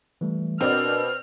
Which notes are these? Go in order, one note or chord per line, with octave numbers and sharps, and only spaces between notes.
E3 G3 A3
B2 C4 D4 A#4 D5 F6